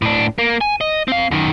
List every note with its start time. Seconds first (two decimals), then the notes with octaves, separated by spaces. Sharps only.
0.02 A2 D4
0.38 A#3
0.61 G#5
0.81 D#5
1.08 C4 F5
1.31 F#2 D#3